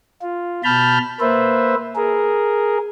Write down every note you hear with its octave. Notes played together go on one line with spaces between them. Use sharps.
F4
B2 A5 B5 F6 G6
A#3 B4 C5 E5
G#4 A#4